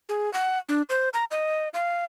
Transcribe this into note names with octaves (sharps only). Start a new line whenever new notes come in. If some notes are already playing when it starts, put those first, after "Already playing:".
G#4
F#5
D4
C5
A#5
D#5
F5